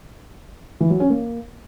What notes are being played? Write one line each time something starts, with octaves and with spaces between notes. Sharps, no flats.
E3
F#3
C#4
A#3